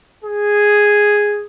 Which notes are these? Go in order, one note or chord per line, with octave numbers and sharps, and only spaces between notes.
G#4